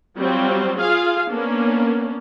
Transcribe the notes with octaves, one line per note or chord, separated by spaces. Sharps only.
F#3 G3 C4 F4
F4 G#4 F5
A#3 B3 C#4 D4